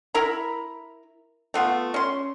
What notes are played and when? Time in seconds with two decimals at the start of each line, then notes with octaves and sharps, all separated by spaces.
0.14 E4 A#4 A#5 B5
1.54 A3 B3 F4
1.94 C#4 C6